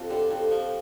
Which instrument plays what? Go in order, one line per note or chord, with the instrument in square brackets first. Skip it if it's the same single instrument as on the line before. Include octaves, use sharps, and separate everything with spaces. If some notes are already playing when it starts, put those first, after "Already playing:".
Already playing: [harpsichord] F2 [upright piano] F4 G4 A4
[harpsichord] D3 [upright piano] G4
[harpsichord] F2 [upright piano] G4
[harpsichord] F3